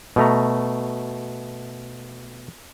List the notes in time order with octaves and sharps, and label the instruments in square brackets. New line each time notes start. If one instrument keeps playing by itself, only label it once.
[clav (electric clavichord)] B2 A3 A#5